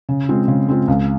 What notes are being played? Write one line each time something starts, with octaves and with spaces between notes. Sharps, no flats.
C#3
G#3 C4 F4
C#3
G#3 C4 F4
C#2